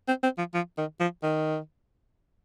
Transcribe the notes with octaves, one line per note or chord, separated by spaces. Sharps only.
C4
C4
F3
F3
D#3
F3
D#3